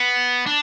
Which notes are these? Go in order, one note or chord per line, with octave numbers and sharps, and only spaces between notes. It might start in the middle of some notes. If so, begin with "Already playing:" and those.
Already playing: B3
D4